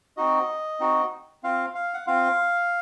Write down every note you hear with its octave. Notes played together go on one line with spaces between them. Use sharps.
C4 D#4 F#4 D#5
C4 D#4 F#4
C4 F4 F5
F5
F#5
C4 F4 F5